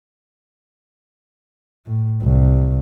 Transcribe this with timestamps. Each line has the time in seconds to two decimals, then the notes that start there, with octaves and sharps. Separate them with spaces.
1.86 A2
2.22 C2